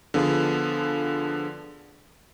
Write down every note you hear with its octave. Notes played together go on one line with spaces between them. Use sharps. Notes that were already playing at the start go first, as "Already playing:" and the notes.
D3 F3 B3 F4 G#4